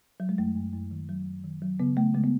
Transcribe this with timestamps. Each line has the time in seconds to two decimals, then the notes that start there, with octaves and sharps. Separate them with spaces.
0.20 F#3
0.29 G#3
0.38 F#2 A3
0.56 F#2
0.74 F#2
0.91 D#3
1.09 F#3
1.26 F#2
1.44 D#3
1.62 F#3
1.80 C#3 B3
1.97 C#3 A3
2.14 C#3 G#3
2.24 B3